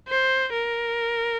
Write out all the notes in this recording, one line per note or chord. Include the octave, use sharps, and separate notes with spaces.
C5
A#4